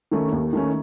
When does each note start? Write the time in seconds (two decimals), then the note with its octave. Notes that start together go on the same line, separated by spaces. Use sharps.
0.11 D#3 A3 C#4
0.32 D#2
0.53 D#3 A3 C#4